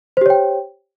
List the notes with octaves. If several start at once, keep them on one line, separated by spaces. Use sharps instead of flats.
G4 C5 C#5 G5